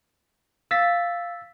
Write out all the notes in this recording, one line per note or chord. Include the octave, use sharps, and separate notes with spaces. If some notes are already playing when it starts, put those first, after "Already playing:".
F5 E6 A6 B6